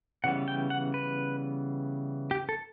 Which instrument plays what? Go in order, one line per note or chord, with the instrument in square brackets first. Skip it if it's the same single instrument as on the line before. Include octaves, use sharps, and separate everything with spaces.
[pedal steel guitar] C#3 E3 G3 B3 F#5
G5
F#5
B4
G4
A4